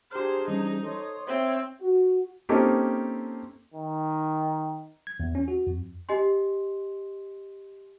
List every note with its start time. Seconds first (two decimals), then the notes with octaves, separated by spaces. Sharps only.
0.11 D4 G4 G#4 C5 A#5 F6
0.48 E3 G3 C#4 D#4
0.83 A4 C#5 C6 D#6
1.27 C4 C5 C#5 E5 E6
1.81 F#4
2.49 A#3 C4 C#4 D#4 G4 A4
3.74 D#3
5.07 G#6
5.20 E2
5.35 C#4
5.48 F#4
5.67 F2
6.09 G4 D#5 G#5 C6